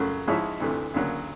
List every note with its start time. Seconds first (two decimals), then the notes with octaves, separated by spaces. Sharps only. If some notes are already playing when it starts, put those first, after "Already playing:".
Already playing: F#2 C#3 F#3 A3
0.27 G#2 F3 G#3 C#4 E4
0.60 D2 C3 E3 A3
0.94 D2 C#3 F#3 A#3